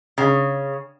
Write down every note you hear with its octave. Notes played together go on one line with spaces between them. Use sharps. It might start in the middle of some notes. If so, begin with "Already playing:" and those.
C#3